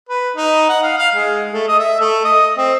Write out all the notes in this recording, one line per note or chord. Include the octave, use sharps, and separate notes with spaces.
B4
D#4
F#5
F5
F5
G#3
A3
D#5
E5
A3
D#5
C4